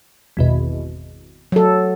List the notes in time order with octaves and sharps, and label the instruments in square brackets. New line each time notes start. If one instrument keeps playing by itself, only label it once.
[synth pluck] G#1 E2 B2
[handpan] F#3 A4